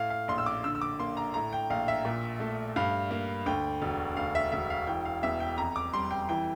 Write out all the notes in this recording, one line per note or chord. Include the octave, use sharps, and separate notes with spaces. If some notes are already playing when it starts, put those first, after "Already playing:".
Already playing: A2 F5
F5
A#1 C6
E6
D6
D3 E6
E6
D6
A#3 C6
A#5
A2 A#5
G5
A#1 F5
E5
A#2
A3
G2 F5
A#3
D2 G5
E1
D2 F5
E5
E1 E5
F5
E3 G5
F5
E2 E5
G5
F2 A#5
D6
G3 C6
G5
E3 G5